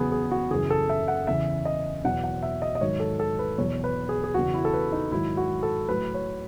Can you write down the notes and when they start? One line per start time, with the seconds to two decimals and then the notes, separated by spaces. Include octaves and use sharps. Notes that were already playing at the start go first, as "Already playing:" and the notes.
Already playing: E2 C#3 F#3 B3 G#4
0.12 G#4
0.31 F#4
0.50 F#2 C#3 E3 G#4
0.70 A4
0.89 E5
1.08 F#5
1.27 E2 C#3 E3 E5
1.65 D#5
2.04 E2 B2 F#3 F#5
2.24 F#5
2.43 E5
2.62 D#5
2.75 D#5
2.81 G#2 D#3 F#3 C#5
3.00 A4
3.20 A4
3.39 B4
3.58 E2 B2 F#3 C#5
3.84 B4
4.09 G#4
4.24 G#4
4.34 E2 C#3 F#3 F#4
4.54 E4
4.65 A4
4.74 B4
4.92 D#4
5.12 G#2 D#3 F#3 E4
5.37 F#4
5.63 A4
5.88 A2 F#3 B4
6.14 C#5